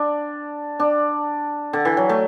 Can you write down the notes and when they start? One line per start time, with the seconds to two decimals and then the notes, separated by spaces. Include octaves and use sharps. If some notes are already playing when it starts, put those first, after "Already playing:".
Already playing: D4
0.80 D4
1.73 D3
1.85 E3
1.97 F#3
2.09 A3